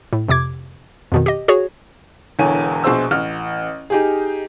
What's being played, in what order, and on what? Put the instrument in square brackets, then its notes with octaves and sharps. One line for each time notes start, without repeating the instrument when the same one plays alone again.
[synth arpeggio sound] A2
F2 C3 D6 G#6
F2 B2 D#3
G4 D#5
F#4 G#4 C#5
[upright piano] E1 E2 D3 C#5 G#5 D#7
A#1 B2 G#4 C5 E6
A1 F6
D#4 G4 G#4